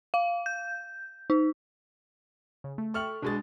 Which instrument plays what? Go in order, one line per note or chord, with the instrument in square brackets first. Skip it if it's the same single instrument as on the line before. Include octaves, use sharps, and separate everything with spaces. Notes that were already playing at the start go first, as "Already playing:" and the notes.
[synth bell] F5
G6
D#4
[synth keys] C#3
A3
[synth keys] A4 E5 G5 [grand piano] C#6 F6 F#7
[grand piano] B2 G#3 A6 [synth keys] D4 D#5